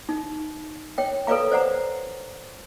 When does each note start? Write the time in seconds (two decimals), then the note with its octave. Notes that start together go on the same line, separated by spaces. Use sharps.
0.09 D#4
0.98 C#5 G5
1.27 A4 B4 C#5 D5 F5 A#5
1.51 C5 D5 F#5 A#5